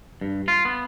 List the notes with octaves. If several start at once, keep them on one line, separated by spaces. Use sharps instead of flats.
G2
F4
B3